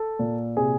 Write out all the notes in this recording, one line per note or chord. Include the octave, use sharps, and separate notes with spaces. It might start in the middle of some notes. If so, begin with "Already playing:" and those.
Already playing: A4
A#2
C3 G#4